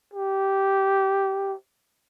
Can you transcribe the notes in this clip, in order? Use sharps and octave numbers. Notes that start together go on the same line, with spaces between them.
G4